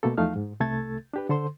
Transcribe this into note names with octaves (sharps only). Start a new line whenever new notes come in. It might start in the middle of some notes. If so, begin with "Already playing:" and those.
B2 A3 A#3 A4
E2 F3 A3 D#4 F5 F6
G#2
C2 C3 A3 A4 G#6 A6
D4 G4 B4
D3 A4 C5 C6